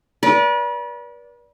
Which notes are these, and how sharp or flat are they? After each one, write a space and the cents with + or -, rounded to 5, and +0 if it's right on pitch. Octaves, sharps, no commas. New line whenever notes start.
B4 -40 D5 -20